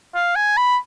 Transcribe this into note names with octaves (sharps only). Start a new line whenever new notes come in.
F5
G#5
B5